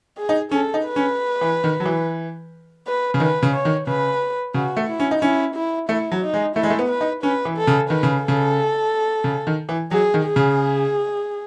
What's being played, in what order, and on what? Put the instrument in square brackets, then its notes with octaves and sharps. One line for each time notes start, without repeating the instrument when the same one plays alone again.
[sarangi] G#4
[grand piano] D#4
[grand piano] C#4 [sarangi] A4
[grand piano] D#4
[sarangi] B4
[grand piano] C#4
E3
D#3
F#3
E3
[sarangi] B4
[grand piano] C#3
[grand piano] D#3 [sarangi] B4
[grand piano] C#3
[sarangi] C#5
[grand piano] D#3
[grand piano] C#3 [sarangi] B4
[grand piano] C#3 [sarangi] F#4
[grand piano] A3
[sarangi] E4
[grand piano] C#4
D#4
[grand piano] C#4 [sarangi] E4
[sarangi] E4
[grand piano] A3 [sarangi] E4
[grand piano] F#3
[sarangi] D#4
[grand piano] G#3
[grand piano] A3 [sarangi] E4
[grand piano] G#3
A3
B3
[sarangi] B4
[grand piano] D#4
[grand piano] C#4 [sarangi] B4
[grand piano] E3
[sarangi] A4
[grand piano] C#3
[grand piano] D#3 [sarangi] B4
[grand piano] C#3
[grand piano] C#3 [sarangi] A4
[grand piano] C#3
D#3
E3
[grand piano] F#3 [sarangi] G#4
[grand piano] D#3
[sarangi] G#4
[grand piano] C#3